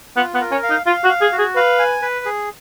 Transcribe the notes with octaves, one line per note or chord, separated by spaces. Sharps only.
B3 F4
B3
A#4
C#4
F5
D#4
F4 F5
F#4
F5
G#4
F#4
G#4
B4 F5
G#5
B4
G#4